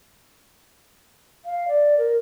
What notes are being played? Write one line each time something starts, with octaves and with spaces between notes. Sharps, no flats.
F5
D5
A#4